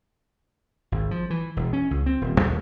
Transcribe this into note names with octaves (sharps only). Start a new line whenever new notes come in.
G#1
F3
E3
E1
C#4
C#2
C4
D#1
D#2